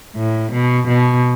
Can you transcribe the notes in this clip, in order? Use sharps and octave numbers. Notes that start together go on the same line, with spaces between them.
A2
B2
B2